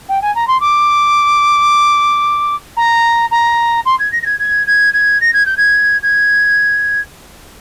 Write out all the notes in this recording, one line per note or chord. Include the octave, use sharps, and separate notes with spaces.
G5
G#5
A#5
C6
D6
A#5
A#5
C6
G#6
A#6
A#6
G#6
G#6
G#6
G#6
A#6
G#6
G6
G#6
G#6